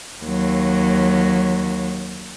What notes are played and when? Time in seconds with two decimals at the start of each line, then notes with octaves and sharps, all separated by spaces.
0.23 D#2 F#3